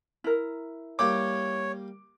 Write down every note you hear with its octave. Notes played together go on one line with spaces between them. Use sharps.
E4 A#4
G3 A#3 C#5 G5 D6